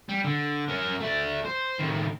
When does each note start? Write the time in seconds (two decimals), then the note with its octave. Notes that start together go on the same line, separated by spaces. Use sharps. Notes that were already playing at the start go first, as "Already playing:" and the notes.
0.09 G3
0.24 D3
0.68 C#4 A#4
1.00 A3 D5
1.45 C5
1.80 A2 D#3